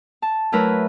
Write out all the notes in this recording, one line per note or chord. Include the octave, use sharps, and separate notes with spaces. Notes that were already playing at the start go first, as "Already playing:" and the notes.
A5
F#3 A3 E4 A#4 B4